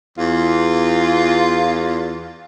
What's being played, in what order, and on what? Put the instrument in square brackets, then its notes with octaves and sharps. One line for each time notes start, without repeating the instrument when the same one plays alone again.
[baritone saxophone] E2 [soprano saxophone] F4